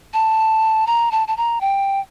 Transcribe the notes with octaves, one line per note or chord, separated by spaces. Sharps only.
A5
A#5
A5
A5
A#5
G5